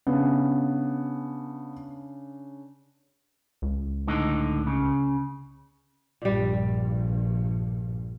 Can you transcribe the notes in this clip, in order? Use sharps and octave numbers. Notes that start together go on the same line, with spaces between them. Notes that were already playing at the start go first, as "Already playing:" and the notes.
C#3 B3 D4
C#2
A2 D3 D#4
C#3
A#1 G2 A#2 G3